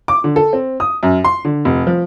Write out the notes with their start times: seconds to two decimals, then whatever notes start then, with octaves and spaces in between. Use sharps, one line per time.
0.08 D6
0.24 D3
0.36 A4
0.53 C4
0.80 D#6
1.03 F#2
1.25 C6
1.45 D3
1.65 F1
1.87 F3